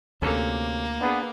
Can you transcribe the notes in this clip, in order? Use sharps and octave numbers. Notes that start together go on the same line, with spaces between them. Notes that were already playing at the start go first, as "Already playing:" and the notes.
D2 C3 A#3 C#4 A4
B3 D4 G#4